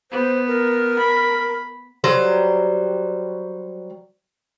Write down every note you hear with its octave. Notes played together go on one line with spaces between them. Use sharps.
B3 C5
A#4
B5
F#3 G3 C5